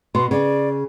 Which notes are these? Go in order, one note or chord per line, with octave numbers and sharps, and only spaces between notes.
B2 C6
C#3 D5